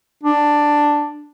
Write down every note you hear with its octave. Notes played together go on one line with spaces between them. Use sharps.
D4